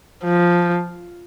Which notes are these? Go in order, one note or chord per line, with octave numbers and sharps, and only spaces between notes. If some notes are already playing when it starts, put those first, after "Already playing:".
F3